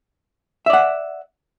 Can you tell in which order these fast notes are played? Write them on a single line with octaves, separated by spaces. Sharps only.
E5 D5 F#5